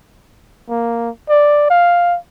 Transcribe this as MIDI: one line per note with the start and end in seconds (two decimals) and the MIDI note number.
0.70 1.09 58
1.29 1.66 74
1.70 2.18 77